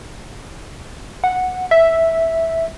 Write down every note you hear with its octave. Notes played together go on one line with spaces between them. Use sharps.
F#5
E5